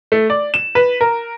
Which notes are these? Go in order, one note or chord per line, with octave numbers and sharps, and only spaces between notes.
A3
D5
E7
B4
A#4